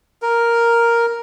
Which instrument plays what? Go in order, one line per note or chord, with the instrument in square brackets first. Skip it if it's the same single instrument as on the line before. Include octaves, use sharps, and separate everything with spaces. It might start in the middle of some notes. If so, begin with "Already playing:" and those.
[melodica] A#4